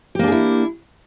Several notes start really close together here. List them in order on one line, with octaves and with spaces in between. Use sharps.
G4 A#3 D4 G#4 E4